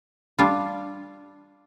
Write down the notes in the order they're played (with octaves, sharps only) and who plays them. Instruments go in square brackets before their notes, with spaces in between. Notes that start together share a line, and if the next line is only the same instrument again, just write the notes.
[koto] G3 D4 F4